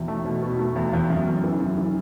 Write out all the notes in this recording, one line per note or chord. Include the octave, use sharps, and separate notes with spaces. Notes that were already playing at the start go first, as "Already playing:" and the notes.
Already playing: E2 B2
A3
B2
B2
A3
E2
E2
F#2
F#2
E3
F#2
E3